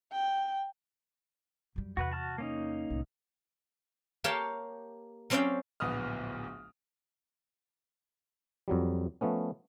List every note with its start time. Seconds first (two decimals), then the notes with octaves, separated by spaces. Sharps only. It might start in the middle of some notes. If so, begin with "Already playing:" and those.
0.12 G5
1.76 F#2 G3
1.97 E2 C3 F#4 B4 F#5
2.11 F#4 A5 F6
2.38 A#3 C#4 D#4
2.90 C2 A2
4.24 A#3 G4 C#5 F5 G5 A5
5.30 F#3 C4 C#4 D5 F5 G5
5.80 D1 A#1 B3 D#6 F6
8.68 F2 F#3 G3
9.21 F3 A3 B3 C#4